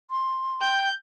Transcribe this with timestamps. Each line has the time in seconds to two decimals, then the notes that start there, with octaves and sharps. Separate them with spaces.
0.11 C6
0.61 G5 G6